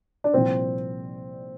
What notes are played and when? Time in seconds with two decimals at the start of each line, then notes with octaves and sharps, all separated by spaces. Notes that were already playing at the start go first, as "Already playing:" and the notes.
0.24 D4
0.33 C2 A#2 F3 C4